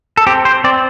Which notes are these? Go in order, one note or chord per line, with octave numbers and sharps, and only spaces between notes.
A4
C4 G4
C5
C4 D5